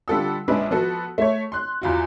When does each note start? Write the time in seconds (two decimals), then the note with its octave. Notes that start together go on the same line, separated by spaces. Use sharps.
0.08 D3 G3 F4 A4 F#5 E6
0.48 A#1 G#3 C#4 D4 B4
0.71 F3 B3 F#4 A4
1.18 A3 C#5
1.52 C6 F#6
1.82 E2 F4 F#4